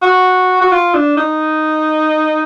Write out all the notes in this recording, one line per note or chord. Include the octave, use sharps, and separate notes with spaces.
F#4
F#4
F4
D4
D#4